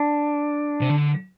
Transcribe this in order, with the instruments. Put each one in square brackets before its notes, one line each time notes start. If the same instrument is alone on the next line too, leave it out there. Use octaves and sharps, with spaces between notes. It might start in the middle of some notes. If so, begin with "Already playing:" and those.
Already playing: [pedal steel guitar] D4
[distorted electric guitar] C3
D3